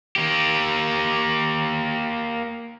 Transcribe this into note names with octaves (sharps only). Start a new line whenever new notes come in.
A#3 G4